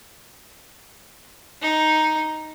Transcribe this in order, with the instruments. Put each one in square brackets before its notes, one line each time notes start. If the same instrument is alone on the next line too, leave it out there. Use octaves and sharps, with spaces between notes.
[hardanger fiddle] D#4